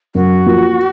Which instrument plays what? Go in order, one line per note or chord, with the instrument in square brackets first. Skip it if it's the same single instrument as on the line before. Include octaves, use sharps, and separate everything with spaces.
[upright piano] F#2 [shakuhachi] F#4
[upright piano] F3 A#3